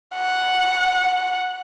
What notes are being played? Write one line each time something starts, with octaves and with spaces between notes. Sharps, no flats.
F#5